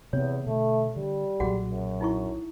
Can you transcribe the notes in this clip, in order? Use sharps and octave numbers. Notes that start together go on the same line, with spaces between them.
E2 C3 B3 C4 C#5
B2 D3 A3
D3 G3
B1 A#2 F#3 F#4 G#4 F#5
F#2
D#4 E4 C#6